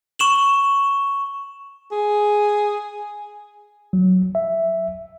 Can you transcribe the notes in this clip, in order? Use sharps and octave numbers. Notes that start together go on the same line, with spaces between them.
C#6 E7 F#7
G#4
F#3
E5